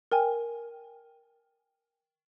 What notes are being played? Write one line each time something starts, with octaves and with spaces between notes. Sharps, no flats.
A#4 G5 G#5